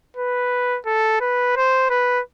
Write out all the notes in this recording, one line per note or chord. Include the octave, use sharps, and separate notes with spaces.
B4
A4
B4
C5
B4